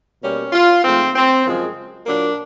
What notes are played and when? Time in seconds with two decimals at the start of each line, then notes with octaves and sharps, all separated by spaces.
0.22 B2 G3 A#3 C#4
0.53 F4
0.84 G#2 F3 A3 C4
1.15 C4
1.45 F#2 C#3 F3 G#3
2.06 A#2 F#3 A#3 D4